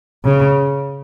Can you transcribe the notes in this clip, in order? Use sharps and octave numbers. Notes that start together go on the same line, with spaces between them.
C#3